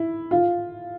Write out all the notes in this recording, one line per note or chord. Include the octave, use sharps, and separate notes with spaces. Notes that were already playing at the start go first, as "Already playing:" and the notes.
Already playing: E4
F4